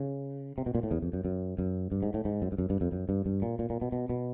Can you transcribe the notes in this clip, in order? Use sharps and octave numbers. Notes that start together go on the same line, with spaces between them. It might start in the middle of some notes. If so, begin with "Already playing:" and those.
Already playing: C#3
C3
B2
A#2
A2
E2
F2
F#2
F#2
F#2
G2
G#2
A2
G#2
F#2
G2
F#2
G2
F2
F#2
G2
G2
A#2
A#2
A#2
B2
B2
B2